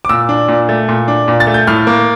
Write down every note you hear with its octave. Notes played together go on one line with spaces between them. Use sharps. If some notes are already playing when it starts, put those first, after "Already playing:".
D6
A#2 E6
D4
A#2
A3
A#2
D4
A#2
A6
A3
G6
A2 F6
A#3